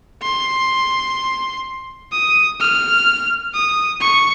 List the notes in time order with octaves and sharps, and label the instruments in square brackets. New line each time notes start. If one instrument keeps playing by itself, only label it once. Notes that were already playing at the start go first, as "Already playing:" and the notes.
[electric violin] C6
D#6
F6
D#6
C#6